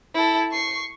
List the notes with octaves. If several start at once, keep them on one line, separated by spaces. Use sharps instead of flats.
E4 A4
C#6 C7